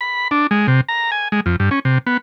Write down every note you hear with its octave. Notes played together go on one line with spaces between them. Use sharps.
B5
D4
G#3
C3
A#5
G#5
G#3
F2
G2
C#4
C3
B3